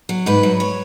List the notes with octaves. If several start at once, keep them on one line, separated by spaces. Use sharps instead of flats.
F#3
G#2 B4
F#3
C#5